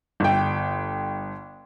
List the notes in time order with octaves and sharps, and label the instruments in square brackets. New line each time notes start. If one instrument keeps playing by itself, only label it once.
[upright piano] G1 G5